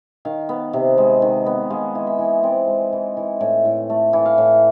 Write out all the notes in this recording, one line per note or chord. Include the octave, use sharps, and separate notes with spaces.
D#3 F5
B3
C3
G#3
D#3
B3
G#3 F5
E3
E5
E3
C4 D5
G#3
E3
E3
A2
A2
A3
E3
F5
A2